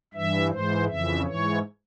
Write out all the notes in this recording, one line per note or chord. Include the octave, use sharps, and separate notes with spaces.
G2 E3 E5
G#2 E3 C5
F2 C#3 E3 E5
G#2 E3 C#5